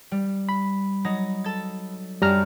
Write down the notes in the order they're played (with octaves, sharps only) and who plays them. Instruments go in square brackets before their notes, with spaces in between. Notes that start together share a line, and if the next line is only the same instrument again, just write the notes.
[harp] G3
[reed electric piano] B5
[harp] F#3 D#4 A#6
A4 A6
[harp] F#2 D4 [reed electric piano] G3 A#5 F6